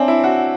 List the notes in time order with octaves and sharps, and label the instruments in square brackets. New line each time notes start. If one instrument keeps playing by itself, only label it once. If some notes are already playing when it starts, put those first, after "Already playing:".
Already playing: [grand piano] C4 D4 [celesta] C#5 E5 G#5
[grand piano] E4
F#4